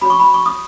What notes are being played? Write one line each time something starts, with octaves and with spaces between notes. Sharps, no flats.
F#4 C#5 B5
C#6
B5
C#6
D#6